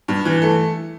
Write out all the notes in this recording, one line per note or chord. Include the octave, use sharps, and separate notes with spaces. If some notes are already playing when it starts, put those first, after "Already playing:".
G2
E3
A3